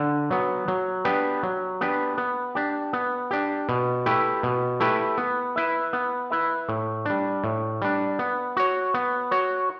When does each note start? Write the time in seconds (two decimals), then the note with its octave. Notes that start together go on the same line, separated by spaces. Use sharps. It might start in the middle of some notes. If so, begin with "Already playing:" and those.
Already playing: D3
0.31 F#3 B3
0.68 F#3
1.05 B3 D4 G4 B4
1.43 F#3
1.81 B3 D4 G4 B4
2.18 B3
2.55 D4 G4
2.93 B3
3.31 D4 G4
3.69 B2
4.06 A3 E4 G4 B4
4.43 B2
4.80 A3 E4 G4 B4
5.18 B3
5.56 E4 B4 E5
5.93 B3
6.31 E4 B4 E5
6.69 A2
7.06 G3 D4
7.44 A2
7.82 G3 D4
8.19 B3
8.57 F#4 C#5
8.94 B3
9.31 F#4 C#5